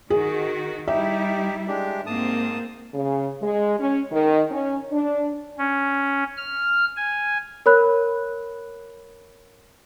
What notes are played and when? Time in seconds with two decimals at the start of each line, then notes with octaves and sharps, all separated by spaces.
0.10 D#3 F#4 G#4
0.88 G3 D#4 E4 G4 E5
1.68 G#3 D4 G4
2.06 G#2 A#3 C4 A5 D#6
2.93 C#3
3.40 G#3
3.78 C#4
4.12 D#3
4.50 C#4
4.91 D4
5.58 C#4
6.37 F6
6.96 G#5
7.66 A#4 C#5 B5 F#6